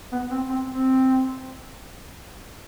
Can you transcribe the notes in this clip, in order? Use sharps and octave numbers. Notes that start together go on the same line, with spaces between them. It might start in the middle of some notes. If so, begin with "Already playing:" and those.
B3
C4
C4
C4